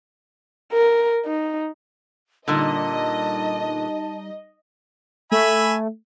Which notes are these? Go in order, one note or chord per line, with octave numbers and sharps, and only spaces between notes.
A#4
D#4
A#2 D3 G3 D#4 D#5 A5
A3 E5 G#5 B5